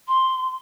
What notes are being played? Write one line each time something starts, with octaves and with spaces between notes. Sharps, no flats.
C6